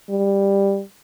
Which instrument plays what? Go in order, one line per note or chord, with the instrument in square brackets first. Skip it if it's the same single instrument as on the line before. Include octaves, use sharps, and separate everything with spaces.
[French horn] G3